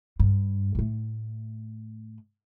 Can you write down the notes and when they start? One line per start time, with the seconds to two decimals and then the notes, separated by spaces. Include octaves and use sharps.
0.19 G2
0.75 A2 A3